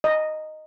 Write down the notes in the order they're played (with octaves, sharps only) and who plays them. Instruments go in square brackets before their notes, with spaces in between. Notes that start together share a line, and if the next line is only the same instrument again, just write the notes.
[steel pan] D#5